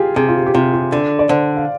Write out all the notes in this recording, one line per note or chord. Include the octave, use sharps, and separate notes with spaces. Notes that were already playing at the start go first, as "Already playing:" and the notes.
Already playing: F4 G4 G#4
C3 G#4
F4
G4
G4
C3 F4
F4
D3
D5
D3 C5
F5